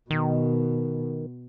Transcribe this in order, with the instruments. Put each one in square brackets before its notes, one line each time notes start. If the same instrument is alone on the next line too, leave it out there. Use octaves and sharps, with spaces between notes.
[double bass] B2 [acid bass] D#3